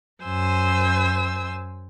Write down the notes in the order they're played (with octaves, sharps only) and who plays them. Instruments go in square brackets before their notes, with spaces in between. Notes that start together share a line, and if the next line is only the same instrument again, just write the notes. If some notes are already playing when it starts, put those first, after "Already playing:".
[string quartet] F#2 C5 G#5 E6